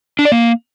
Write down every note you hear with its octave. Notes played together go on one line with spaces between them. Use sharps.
D4
D5
A#3